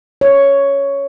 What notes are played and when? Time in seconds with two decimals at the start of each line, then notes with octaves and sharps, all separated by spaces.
0.21 C#5